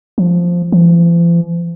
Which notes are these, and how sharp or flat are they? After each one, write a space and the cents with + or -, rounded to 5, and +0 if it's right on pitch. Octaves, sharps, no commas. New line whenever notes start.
F3 +0
F3 -45